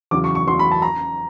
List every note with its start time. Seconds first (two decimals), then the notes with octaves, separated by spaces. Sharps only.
0.11 E2 C#3 F#3 D6
0.24 C#6
0.35 C#6
0.47 E2 C#3 F#3 C6
0.59 B5
0.71 A5
0.82 A#5